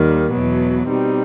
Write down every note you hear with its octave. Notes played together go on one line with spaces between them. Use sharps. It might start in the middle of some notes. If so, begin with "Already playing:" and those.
Already playing: D#2 D#3 G3
E2 B2 F#3 B3
B2 G3 C4 D#4